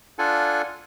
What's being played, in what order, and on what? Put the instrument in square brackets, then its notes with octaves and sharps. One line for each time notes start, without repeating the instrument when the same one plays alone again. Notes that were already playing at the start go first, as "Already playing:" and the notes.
[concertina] D4 F4 A4 F#5 G#5